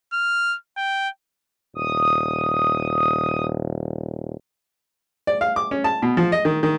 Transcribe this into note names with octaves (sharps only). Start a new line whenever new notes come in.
F6
G5
D#1 D#6
D5
F5
D6
C#4
A5
B2
F3
D#5
D#3
D#3